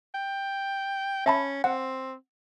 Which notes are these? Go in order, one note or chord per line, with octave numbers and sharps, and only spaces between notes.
G5
C#4 E5 A5 B5
C4 F#5